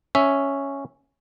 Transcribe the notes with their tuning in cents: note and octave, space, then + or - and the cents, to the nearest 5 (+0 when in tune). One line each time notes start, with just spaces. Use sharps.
C#4 +0 E5 +0